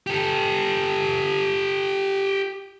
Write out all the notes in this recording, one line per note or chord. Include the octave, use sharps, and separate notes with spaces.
G4 A4